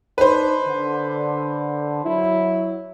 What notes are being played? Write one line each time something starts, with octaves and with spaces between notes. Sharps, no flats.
D4 D#4 B4 C5
D3
F#3 E4